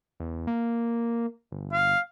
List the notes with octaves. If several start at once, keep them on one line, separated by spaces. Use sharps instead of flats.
E2
A#3
G1
F5